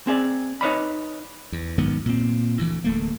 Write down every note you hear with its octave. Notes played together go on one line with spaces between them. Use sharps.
C4 G#4 D5
D#4 B4 C#5 D5 B5
E2
B1 G#2 D#3 B3
A#2 C4
D2 E3
D1 A3 A#3